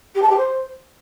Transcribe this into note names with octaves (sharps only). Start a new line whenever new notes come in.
G4
A5
G4
C5